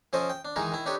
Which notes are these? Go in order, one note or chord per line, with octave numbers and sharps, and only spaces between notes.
F3 C#4 A4 C5 D#5
G5
D4
D#3 E3 G#3 D#4 G#4 A#4
D#3 E4
D4 D#4 G4 A4 B4 C#5